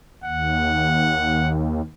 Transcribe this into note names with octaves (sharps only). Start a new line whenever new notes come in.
D#2 F#5